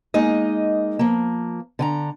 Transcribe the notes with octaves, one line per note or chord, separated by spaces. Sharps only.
G#3 A#3 D#4 D#5
F3 A#3
D3 G#5 A#5